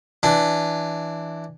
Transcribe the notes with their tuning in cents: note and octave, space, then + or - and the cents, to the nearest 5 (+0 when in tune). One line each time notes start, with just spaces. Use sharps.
E3 +0 D4 +0